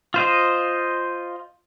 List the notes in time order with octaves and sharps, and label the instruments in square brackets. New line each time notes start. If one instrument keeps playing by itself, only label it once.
[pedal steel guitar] F4 C5 D#5